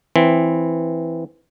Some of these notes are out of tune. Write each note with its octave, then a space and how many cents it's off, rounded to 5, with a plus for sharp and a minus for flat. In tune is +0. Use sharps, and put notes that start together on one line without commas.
E3 +0 C4 +0